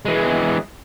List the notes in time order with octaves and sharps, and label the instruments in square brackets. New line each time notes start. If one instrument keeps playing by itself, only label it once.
[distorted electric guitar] E3 G#3